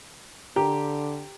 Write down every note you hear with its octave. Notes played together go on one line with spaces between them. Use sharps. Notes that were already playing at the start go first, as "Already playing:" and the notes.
D3 G4 A#5